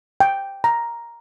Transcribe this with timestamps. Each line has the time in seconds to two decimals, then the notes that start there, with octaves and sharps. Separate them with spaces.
0.20 G5
0.64 A#5